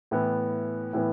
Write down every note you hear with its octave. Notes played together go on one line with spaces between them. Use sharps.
A2 E3 B3
A2 E3 B3